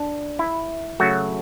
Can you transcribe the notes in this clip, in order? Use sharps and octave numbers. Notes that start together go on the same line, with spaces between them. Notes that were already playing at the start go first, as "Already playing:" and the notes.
Already playing: D4
E4
C#3 F#3 A3 F#4